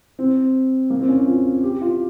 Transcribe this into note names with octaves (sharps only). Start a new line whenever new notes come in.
C4
A#3
C4
C#4
F4
G4
F4